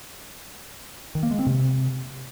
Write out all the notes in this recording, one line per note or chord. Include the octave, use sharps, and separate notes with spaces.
D#3
A#3
G#3
C4
C3